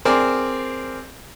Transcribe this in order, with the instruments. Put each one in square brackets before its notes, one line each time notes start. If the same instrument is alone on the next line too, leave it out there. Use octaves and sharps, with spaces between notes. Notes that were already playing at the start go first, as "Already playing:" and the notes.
[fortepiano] C4 G#4 A#4 C5 D5